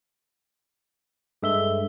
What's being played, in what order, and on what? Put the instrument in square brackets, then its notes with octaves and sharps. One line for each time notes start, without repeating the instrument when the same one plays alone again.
[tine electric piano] G2 G#3 E5 [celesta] A4 E6 G7